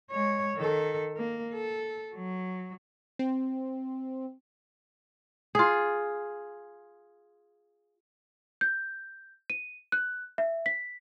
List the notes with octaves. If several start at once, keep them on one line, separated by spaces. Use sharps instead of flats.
G#3 C#5
D#3 A4
A#3
A4
F#3
C4
F4 G#4
G6
D#7
F#6
E5
B6